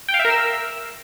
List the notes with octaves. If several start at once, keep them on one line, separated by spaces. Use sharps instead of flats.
G5
F5
E5
A#4
E6